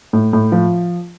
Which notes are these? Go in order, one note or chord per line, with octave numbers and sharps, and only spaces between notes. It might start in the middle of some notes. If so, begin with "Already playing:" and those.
A2
A2
F3